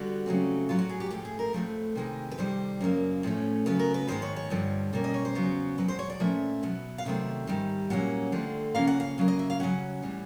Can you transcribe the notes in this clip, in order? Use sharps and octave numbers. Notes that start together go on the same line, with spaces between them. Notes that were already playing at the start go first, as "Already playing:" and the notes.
Already playing: D3 G3 B3 F#4
C#3 F#3 A3 C4
A2 F#3 B3 F4
F#4
G#4
G4
A2 F3 A3 G4
G#4
A#4
A2 F3 A3 C4 B4
C3 D#3 G#3 C4
B4
F2 C3 D#3 G3 C5
F#2 C#3 F#3 A#3
A2 F3 A3 C#4
C#3 F#3 B3 B4
A#4
B4
G#2 D#3 G#3 B3 C5
C#5
C#5
G2 D3 F3
B2 G3 A#3 C#4
D#5
C#5
C5
E2 C#3 F#3 B3
E2 B2 F#3 B4
C5
C#5
D5
A#2 F3 A3 C#4 E5
B2 F#3 B3
F5
C3 D#3 F#3 A3 C4 E5
G#2 D#3 G3
A#2 F#3 A#3 C#4 F#5
D3 F3 A3 C4
C#3 F3 A#3 C#4 F5
F#5
F5
C#3 F#3 A#3
D#5
E5
F5
C#3 F#3 A#3 C#4 F#5
A2 E3 G3